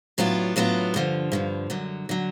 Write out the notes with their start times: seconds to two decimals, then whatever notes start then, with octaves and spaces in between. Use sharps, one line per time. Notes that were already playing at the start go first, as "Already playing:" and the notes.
0.18 A2 F#3 B3 D4 F4
0.56 A2 F#3 B3 D4 F4
0.94 G2 D3 F3
1.32 G2 D3 F3
1.70 F#2 D3 F#3
2.09 D3 F#3